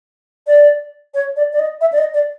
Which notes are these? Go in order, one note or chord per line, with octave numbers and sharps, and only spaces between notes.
D5
C#5
D5
D5
D#5
E5
D5
D#5
D5